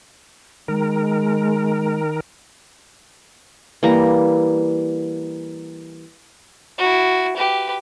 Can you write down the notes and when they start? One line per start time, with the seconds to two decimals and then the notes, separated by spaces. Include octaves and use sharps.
0.68 D#3 G#3 A#4
3.83 E3 G3 A#3 A#5
6.78 E4 F#4
7.36 G4 B4